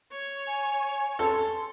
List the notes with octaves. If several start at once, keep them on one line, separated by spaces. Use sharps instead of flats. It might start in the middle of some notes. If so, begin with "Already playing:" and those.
C#5
G#5
A4 C6